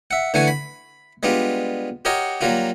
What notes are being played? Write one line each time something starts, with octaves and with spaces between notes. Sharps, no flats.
E5 F#5
D3 E3 A3 F#5 G#5 C#6
B5
G3 G#3 B3 D4 F4
F#4 G4 A#4 C#5 D#5 F#5
F#3 G3 A#3 F4 F#4